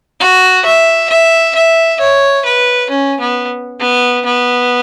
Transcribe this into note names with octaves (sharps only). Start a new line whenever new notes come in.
F#4
E5
E5
E5
C#5
B4
C#4
B3
B3
B3